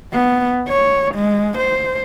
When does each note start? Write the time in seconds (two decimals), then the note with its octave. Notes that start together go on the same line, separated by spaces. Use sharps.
0.13 B3
0.68 C#5
1.15 G#3
1.58 C5